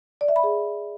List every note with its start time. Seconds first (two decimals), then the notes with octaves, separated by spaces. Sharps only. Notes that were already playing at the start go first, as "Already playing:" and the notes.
0.21 D5
0.28 E5
0.36 B5
0.43 G#4